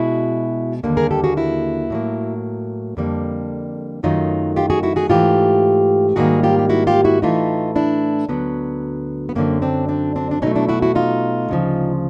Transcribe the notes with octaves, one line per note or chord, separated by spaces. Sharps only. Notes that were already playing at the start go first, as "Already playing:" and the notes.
Already playing: B2 G#3 E4 F#4
D#2 D3 G3 A#3
G#4 A#4
G4 A4
F#4 G#4
E4 F#4
A2 F#3 A#3
F2 D3 G3 A#3
F#2 D#3 F#3 A3 D#4 F4
F4 G4
F#4 G#4
E4 F#4
F#4 G#4
G#2 E3 A3 F4 G4
G#2 D#3 G3 A#3 F#4 G#4
F4 G4
G4
E4 F#4
F4 G4
E4 F#4
A2 E3 A3 D#4 F4
D4 E4
D2 D3 F#3 B3
B3
F#2 D3 F#3 A#3 C4
C4 D4
C4 D4
C4 D4
D4
B2 F#3 A3 C#4 D#4
D4 E4
E4 F#4
E4 F#4
D#4 F4
D2 C#3 F3